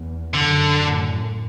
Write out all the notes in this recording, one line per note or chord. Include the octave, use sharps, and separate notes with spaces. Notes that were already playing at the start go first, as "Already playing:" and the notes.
Already playing: E2
F#2 D3
F#2 A2